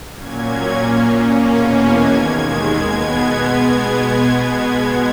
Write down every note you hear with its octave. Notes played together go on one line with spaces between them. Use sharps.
A#2 F#3 A#3 C#4 G#6
A#2 A#3 C#4
E2 B2 A#3 C#4 G#6
G#6
D#2 D#3 G#3 G#6
B2 G#3 B3 G#6